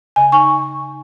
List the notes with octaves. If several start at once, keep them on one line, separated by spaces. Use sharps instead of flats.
C#3 D#5 G#5
D#4 G#5 C#6